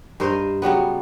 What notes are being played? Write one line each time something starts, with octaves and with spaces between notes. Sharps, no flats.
G2 A#4 C5 D#5
C#3 F#3 G3 B3